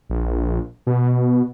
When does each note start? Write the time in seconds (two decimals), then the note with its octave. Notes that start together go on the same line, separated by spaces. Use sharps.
0.10 A#1
0.87 B2